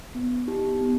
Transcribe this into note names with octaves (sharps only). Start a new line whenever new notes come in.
B3
D#4 G4
B3